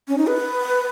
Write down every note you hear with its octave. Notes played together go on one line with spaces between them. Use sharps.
C#4
D#4
B4